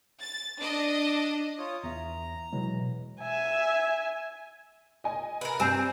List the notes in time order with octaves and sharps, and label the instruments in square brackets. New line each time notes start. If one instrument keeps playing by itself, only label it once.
[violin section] A6
D4 D#5
[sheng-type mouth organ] F4 C#5 D#6
[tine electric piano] E2 E5 [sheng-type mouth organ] A#5
[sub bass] B2 [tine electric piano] E3 F#3 G#3
[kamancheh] E5 G#5
[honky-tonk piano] D#5 G#5
[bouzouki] A#4 B4
[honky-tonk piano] G2 G#5 C7 [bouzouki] C4